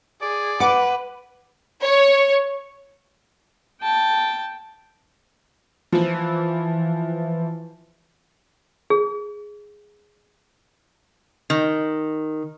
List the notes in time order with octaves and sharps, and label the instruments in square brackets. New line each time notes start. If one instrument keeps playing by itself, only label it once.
[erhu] G#4 [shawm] D5
[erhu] B4 [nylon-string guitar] F#5 [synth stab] D6
[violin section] C#5
[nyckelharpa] G5 A5
[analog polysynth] E3 [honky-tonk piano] F3
[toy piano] G#4
[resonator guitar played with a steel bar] D#3